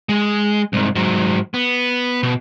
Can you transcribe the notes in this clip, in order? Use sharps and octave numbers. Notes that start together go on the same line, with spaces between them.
G#3
C2 G#2
G#2 F#3
B3
B2